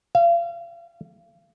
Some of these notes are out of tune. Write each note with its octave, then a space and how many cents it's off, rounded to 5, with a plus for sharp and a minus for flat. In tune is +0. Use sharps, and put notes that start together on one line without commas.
F5 -35